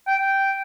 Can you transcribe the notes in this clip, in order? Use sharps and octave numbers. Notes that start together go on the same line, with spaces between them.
G5